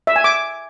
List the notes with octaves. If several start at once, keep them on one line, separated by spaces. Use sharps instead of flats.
E5
G#5
D6